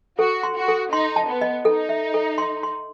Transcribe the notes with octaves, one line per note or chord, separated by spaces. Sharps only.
F#4 A4
C6
F#4
A4
D#4 C6
A5
B3
D#5
D#4 A4
E5
A4
C6
C6